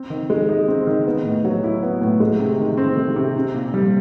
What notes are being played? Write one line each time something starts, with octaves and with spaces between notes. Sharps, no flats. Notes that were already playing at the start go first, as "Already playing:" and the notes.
Already playing: C4
D#3
G#3
D#4
C4
D#3
B3
A2
F#3
E4
B3
A2
G#3
C3
D#3
C4
G#3
C3
C4
A#2
G3